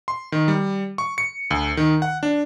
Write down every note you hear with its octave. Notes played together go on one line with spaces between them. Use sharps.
C6
D#3
G3
C#6
C#7
D2
D#3
F#5
D4